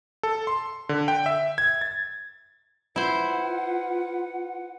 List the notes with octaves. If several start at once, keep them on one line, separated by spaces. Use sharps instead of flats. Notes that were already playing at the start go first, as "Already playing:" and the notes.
A4
C6
D3
G5
E5
G#6
A6
E4 F4 B4 C5 F#5